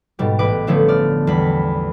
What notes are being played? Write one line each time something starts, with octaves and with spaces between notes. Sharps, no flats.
G#2 B2 G3 G4
A1 B4 D6 D7
D3 F3 A3 B3 C#4 E4
D5 F6
E2 G3 B5